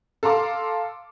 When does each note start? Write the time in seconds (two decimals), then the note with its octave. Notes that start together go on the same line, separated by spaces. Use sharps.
0.23 A4 F5 A#5 C6 D6